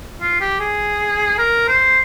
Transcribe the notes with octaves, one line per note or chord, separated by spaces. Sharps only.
F4
G4
G#4
A#4
C5